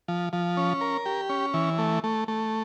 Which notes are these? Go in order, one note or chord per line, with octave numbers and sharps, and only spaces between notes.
F3
F3
C#4
A#4
G4
C#4
E3
A3
A3
A3